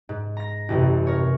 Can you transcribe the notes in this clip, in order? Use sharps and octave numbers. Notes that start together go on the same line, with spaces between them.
G#2
A#5 A#6
A1 F#2 A2 C3
A#4 C#5